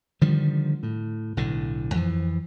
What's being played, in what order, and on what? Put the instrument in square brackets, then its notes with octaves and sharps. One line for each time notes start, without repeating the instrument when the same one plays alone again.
[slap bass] D3 D#3 F3 G3
A2
B1 A2 D3
F2 E3 F3